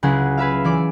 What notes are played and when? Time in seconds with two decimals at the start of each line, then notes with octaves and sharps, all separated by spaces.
0.03 C#2 C#3 F#3 E4 G#4 F#5
0.38 G#4 B4 E5 F5
0.64 E3 D5 D6